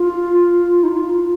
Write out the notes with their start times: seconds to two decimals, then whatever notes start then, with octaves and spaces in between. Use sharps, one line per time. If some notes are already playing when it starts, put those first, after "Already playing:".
Already playing: F4
0.83 D#4
0.88 F4